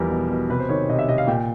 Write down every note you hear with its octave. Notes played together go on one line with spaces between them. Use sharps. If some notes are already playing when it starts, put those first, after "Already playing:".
Already playing: E2 F3 G3 A#4
B2
B2
C3 B4
C5
D#3 C#5
C3 D#5
E5
C3 D#5
F5
A#2 G5